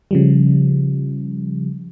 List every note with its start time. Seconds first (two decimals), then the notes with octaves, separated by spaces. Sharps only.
0.11 C#3 F3 G3